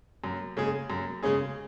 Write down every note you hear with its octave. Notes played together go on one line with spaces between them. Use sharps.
F#2
C#3 G#3 C#4 G#4
F#2
C#3 G#3 C#4 G#4